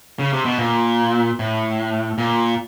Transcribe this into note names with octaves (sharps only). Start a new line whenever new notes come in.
C#3
C3
B2
A#2
A2
A#2